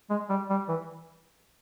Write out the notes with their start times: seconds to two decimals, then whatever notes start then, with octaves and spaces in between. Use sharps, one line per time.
0.10 G#3
0.29 G3
0.50 G3
0.68 E3